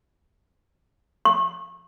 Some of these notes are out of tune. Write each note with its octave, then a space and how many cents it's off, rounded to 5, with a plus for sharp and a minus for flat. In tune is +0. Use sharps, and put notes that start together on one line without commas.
C#6 -30